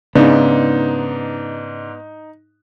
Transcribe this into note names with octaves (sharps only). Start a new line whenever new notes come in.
G#2 C#3 B3 D4 D#4